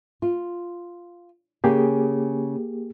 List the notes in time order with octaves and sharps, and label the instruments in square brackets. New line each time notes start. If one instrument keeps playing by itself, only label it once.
[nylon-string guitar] F4
[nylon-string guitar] C#3 [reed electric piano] A#3 G4 G#4